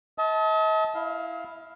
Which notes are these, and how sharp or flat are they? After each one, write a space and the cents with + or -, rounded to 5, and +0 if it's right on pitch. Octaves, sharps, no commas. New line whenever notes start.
D#5 +45 A5 -15
E4 +0 F5 +0